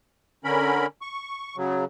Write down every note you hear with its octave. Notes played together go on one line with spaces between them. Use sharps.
D3 C#4 A#4 B5
C#6
C#3 F#3